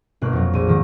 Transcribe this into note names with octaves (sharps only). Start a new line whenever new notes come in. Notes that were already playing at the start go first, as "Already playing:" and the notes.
G1 B2 A#3 F#6
F2 F#3
A#1 D#7
G#2 D#3 F3